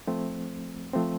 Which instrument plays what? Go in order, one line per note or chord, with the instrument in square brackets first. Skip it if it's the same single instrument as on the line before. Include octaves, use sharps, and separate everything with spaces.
[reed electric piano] F3 A3 C4
F3 A3 C4